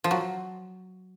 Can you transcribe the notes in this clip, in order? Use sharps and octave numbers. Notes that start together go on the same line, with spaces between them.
F3
F#3